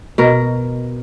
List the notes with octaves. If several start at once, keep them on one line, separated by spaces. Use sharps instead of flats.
B2 A#4